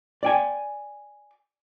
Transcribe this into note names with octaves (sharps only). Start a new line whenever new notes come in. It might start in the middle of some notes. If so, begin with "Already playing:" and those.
D5 G5 G#5